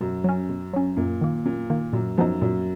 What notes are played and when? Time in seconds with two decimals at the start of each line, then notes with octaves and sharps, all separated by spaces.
0.01 F#2 B2
0.24 F#3 C#4
0.49 B2
0.73 F#3 C#4
0.96 F#2 A#2
1.21 D#3 A#3
1.45 F#2 A#2
1.70 D#3 A#3
1.93 F#2 A#2
2.18 F#2 F3 B3 D#4
2.42 F#2 A#2